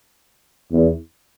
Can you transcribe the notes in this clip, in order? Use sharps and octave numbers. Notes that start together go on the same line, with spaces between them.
E2